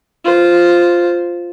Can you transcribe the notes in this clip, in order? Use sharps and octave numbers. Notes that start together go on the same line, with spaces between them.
F4 C5